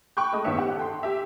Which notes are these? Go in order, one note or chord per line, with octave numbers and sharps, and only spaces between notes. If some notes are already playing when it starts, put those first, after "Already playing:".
G5 B5 C#6 D6 F#6 G6
G#3 A3 D#5 D#6
A1 D#3 B3 C5 E5 C#7
G4 F#5
A4 G5 C6
G4 E5